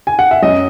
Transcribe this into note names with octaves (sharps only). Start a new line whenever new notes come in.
G#5
F#5
E5
F#2 D#5